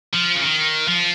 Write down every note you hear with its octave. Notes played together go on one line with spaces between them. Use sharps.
F3
C#3
D#3
F3